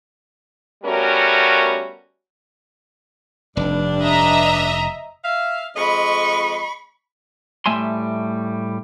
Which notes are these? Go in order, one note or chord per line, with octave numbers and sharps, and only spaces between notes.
G3 A3 B3 C#4 F#4 A#4
F1 G2 D4
D#5 E5 A#5
E5 F5
F2 G#3 D#5 B5 C#6
A2 G3 A3 E5 G#5 C6